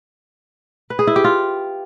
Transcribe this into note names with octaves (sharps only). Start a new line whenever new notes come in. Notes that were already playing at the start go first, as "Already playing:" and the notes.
B4
G#4
E4
G4
F4